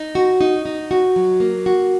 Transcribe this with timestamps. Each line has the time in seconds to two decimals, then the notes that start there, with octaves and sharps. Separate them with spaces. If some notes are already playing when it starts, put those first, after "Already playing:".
Already playing: D#4
0.15 F#4
0.41 D#4
0.65 D#4
0.91 F#4
1.16 F#3
1.40 A#3
1.66 F#4